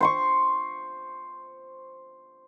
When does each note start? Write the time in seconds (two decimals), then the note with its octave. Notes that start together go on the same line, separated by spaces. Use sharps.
0.01 C5 C6 C#6